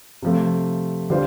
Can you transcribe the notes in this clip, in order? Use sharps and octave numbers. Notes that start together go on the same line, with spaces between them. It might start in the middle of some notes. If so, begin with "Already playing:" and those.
C3 F3 A3
D3 G3 F4 C5